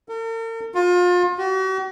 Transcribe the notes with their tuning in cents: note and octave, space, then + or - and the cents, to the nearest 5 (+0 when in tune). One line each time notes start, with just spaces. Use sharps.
A#4 -45
F4 +35
F#4 +45